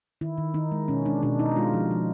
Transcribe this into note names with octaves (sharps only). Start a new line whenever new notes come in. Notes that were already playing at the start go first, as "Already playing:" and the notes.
D#3 E4
D#3
D#3 D#4
G#3
B2 C#4
G#3 D4
B2 D4
B2 D#4
G#3 F4
F3
F3